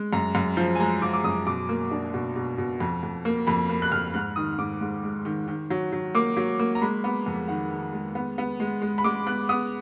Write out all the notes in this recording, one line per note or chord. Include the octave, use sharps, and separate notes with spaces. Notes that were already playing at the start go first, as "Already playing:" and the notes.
Already playing: G#3
F#2 A#5
F#2
F3
G#5
G#3 A#5
F3 D6
D6
F#2 D#6
B2 D6
A#3
D4
B2
B2
B2
F2
F2
A#3
F2 B5
A#3
F#6
F2 F6
G#2 F#6
D#3 D#6
G#2 D6
G#2
G#3
D#3
D#3
F#3
F#3
A#3 D6
F#3
A#3
A#5
G#3 B5
B3
F2
D#3 F#5
D#3
G#3
B3
B3
G#3
G#3
B5
G#3 D6
B3 F#6
B3 D#6